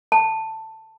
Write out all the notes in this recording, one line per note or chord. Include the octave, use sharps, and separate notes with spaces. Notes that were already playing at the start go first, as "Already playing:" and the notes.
A5